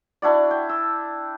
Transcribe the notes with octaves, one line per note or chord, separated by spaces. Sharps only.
D4 E4 F#4 D5
G5
E6